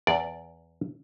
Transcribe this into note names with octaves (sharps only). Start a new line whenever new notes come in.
E2 D5